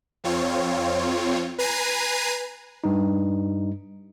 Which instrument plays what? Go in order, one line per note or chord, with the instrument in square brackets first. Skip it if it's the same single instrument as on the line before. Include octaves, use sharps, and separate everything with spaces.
[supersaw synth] F2 C4 F4 C#5
B4 G#5 A#5 C7 D#7
[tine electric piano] G2 D#4